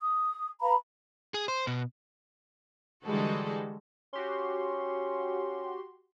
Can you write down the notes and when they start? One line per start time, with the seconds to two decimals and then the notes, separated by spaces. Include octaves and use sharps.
0.01 D#6
0.62 B4 F5 A#5 B5
1.34 G#4
1.48 C5
1.67 B2
3.05 D3 E3 G3 G#3 F#4 A4
4.13 C#4 F#4 G4 C6